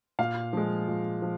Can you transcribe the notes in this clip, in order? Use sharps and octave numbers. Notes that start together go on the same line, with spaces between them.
A#2 F5
F3 G#3
A#2
F3